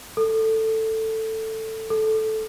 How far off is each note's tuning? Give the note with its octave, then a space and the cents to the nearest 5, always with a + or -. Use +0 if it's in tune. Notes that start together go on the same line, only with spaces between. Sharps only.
A4 +10
A4 -10